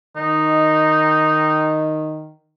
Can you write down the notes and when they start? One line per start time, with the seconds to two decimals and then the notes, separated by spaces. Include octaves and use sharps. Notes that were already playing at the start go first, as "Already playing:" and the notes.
0.16 D#3 D#4